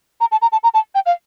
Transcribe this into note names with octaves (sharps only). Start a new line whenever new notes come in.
A#5
A5
A#5
A5
A#5
A5
G5
F5